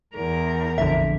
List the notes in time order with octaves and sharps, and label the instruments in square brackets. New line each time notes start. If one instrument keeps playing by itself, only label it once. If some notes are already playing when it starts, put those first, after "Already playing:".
[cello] E2 A#4
[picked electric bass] A#1 F2 D3 [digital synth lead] E5